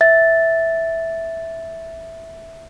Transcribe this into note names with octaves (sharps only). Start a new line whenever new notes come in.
E5 A6